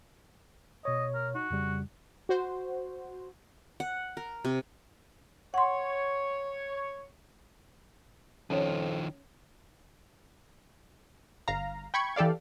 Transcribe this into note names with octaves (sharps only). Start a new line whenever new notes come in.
B2 C#5 D#5
A#4
D#4 F#4
F2 C#3 G3
F#4 C5
F#5
A#4
C3
C#5 F#5 C6
F2 D#3 F3 C#4 C#5
G1 F5 A#5
G5 B5 C#6 G#6
E3 G4 A4 D5 F5